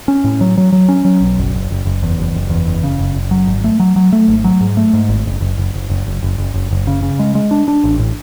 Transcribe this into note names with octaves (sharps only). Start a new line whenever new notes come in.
C#4
A2
F#3
F#3
F#3
C#4
F#3
B1
F#1
F#1
F#1
F#1
E2
F#1
F#1
E2
F#1
C#3
F#1
F#1
F#3
G#1
A3
F#3
F#3
A3
G#1
F#3
G#2
A3
G#2
G#1
F#1
F#1
F#1
F#1
F#1
F#1
F#1
F#1
F#1
F#1
C#3
C#3
G#3
G#3
D4
D4
A1
A2